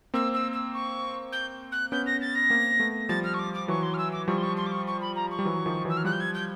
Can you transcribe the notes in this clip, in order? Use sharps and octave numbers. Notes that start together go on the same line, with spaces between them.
A#3 C4 E6
E6
E6
C#6
G6
F#6
B3 C#4 G6
A#6
A6
A#6
A#3 C4
A3 B3
F3 G3 A6
F6
C#6
D6
D6
E3 F#3 C#6
C6
F6
E6
D6
F3 G3 C#6
C6
C#6
C6
D6
C#6
C#6
B5
A#5
C#6
G3
E3 F#3
D#3 F3
E3 F#3 E6
F6
F3 G3 F#6
G6
G#6
G6